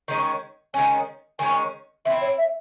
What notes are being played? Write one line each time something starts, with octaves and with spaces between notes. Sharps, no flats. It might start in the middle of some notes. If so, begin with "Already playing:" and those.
D#3 G#3 C#4
D#3 G#3 C#4 G#5
D#3 G#3 C#4 G#5
E3 C4 E4 E5
C#5
E5